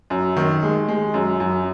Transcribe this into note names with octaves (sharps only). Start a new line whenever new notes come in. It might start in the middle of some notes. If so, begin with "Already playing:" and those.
F#2
D#3
G#3
G#3
F#2
F#2